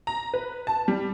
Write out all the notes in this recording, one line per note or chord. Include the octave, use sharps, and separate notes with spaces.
A#5
B4
A5
G3